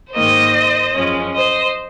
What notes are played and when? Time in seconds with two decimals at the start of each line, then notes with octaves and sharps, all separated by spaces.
0.14 G#2 D#3 A#3 C5 D#5
0.95 F#2 F3 G#3 C#4
1.35 C5 D#5